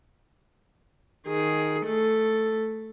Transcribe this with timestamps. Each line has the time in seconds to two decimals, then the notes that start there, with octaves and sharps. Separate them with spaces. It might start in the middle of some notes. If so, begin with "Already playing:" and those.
1.27 D#3 G#4
1.86 A3 A4